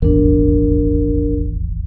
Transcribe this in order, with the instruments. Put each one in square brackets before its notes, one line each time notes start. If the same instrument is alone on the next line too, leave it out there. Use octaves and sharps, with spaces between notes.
[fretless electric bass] D#1 G#1 E2 [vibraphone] D4 A#4